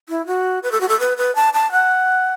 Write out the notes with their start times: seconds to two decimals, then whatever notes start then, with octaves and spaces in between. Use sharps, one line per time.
0.09 E4
0.27 F#4
0.63 B4
0.72 A4
0.81 F#4
0.88 A4
1.00 B4
1.17 B4
1.35 A5
1.54 A5
1.72 F#5